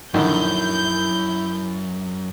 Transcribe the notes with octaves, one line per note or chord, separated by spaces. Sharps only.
A#1 F#2 D3 D#3 E4 G6